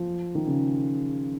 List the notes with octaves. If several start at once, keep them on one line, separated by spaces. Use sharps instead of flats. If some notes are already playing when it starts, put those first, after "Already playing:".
Already playing: F3
D#3
C#3